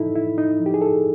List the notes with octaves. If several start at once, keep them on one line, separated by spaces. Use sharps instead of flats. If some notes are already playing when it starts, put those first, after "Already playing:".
Already playing: A2 F3 D#4 E4 A4
A2 E4
D#4
F3
G4
G#4
A4